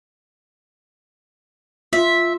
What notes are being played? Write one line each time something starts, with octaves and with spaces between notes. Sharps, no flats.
F4 E5